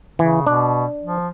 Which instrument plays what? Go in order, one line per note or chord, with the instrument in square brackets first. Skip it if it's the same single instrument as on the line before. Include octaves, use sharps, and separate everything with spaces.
[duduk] C#3 [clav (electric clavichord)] E3
[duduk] B2 [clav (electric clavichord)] D4
[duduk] F3